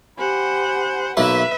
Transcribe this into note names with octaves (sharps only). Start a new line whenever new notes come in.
G4 C5 F#5 G#5 B5
B1 A#3 E4 B4 E5